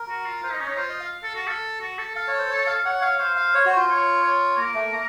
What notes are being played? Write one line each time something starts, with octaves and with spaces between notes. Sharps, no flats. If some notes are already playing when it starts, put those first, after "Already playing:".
Already playing: A#4
F#4
F4
F4 C5
D#4 D#5
C#4
D#4 C#5
F4 C5
D#5
F5
A4
F#4
A4
F#4
A4
A4 F5
C#5
C5
C#5
F5
C#5 F#5
C#5 F5
C5 F5
F5
C#5
F#4
F4
C#5
C#5
A#3 A#4
A3
A#3